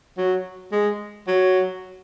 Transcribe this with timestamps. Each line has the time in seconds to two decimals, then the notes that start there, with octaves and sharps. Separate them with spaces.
0.18 F#3
0.72 G#3
1.28 F#3